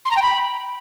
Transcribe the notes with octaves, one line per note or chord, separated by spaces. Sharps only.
C6
A#5
G5
B5